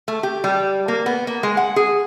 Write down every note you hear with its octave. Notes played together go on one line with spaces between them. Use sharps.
A3
G4
G3
A#3
B3
A#3
G#3
F#5
G#4